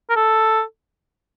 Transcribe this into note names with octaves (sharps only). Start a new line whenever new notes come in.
A#4
A4